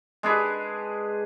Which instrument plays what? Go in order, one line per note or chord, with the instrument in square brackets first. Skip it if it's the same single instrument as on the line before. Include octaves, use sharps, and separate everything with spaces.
[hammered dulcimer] G#3 D4 G#4 B4